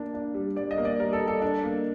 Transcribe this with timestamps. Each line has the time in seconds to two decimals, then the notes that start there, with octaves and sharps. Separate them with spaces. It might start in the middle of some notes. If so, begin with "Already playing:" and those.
Already playing: A#3 D4
0.14 D4
0.34 G3
0.56 G3 D5
0.71 D#5
0.78 A#3
0.85 D5
0.99 G3 A#4
1.13 A4
1.20 G3
1.28 A4
1.42 D4
1.63 A#3